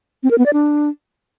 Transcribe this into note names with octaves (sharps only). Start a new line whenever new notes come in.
C4
A#4
B3
D5
D4